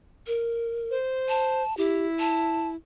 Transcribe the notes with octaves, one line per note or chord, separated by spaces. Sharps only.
A#4
C5
A5
E4 G4
A5